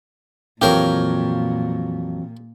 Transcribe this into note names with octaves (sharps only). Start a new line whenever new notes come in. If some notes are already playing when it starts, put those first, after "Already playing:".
F2 A#2 E3 F#3 C4 G4 A#4 F5